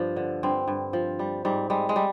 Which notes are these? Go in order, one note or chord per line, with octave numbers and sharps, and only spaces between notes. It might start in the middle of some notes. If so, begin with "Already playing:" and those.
Already playing: G2 F3 D4
D3
G2 C4
G2
F3
G3
G#2 G3
G3 G#3
G#3
G3